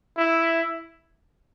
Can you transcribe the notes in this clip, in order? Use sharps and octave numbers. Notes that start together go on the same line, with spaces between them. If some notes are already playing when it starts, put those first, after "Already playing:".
E4